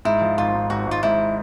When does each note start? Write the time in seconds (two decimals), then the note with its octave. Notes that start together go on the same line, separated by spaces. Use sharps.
0.05 G#2 E4
0.22 F3
0.38 G#1 F4
0.54 G#2
0.70 G#1 F#4
0.87 G#1 F4
1.03 G#2 E4